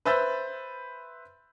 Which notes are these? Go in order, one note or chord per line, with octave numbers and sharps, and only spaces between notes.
B4 C5 E5 E6 G6 A6